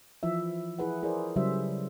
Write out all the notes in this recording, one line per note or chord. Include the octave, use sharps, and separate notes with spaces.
E3 F3 E4 E5
E4 G#4 B4 F#5
E4 G#4 A#4 C5 D5
C#3 F#3 G3 C5 E5